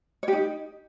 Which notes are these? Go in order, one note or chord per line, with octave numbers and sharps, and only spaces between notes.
C#5
G4
D#4